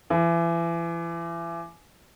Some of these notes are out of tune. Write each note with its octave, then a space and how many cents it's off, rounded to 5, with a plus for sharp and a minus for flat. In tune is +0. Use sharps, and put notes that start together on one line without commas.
E3 +35